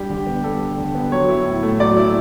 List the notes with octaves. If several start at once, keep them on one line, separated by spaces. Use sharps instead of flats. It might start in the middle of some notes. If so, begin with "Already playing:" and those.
Already playing: G3 D4 G4
D3
B3
G3 A4
D4
D3
B3
F#3 C#5
E4
A2
A3
F#3 D5
E4